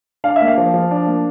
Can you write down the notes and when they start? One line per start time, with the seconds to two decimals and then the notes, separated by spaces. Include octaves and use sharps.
0.24 D4 F5
0.36 E5
0.41 A#3
0.48 F5
0.58 F3
0.74 F3
0.91 D4
1.06 A#3